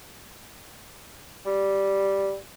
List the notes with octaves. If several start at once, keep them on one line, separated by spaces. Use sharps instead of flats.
G3